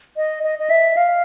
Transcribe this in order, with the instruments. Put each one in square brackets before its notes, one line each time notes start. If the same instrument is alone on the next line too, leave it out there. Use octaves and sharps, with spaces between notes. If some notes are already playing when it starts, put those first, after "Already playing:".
[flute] D#5
D#5
D#5
E5
F5